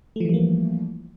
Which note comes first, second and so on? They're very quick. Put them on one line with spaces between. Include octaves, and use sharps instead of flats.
A3 F3 E3 G3 A#3